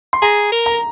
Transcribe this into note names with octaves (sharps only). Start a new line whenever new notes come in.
C6
G#4 A#5
A#4
A#5